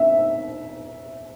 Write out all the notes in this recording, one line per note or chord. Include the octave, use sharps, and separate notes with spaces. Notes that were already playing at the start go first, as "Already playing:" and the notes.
Already playing: E5